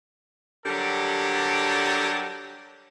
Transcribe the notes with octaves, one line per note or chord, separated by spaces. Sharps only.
D3 F#3 G3 G4 A4 A#4